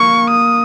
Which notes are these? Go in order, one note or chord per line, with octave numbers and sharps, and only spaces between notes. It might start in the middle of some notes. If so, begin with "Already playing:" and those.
Already playing: A#3 C#6
D#6